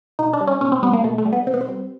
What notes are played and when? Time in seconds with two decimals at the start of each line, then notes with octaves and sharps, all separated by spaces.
0.19 B2 D#4
0.33 D4
0.40 G3
0.47 C#4
0.61 B2 C#4
0.72 C4
0.83 G3 B3
0.93 A#3
1.04 B2 A3
1.18 A3
1.25 G3
1.32 B3
1.47 B2 C4
1.54 B3
1.61 C4
1.68 G3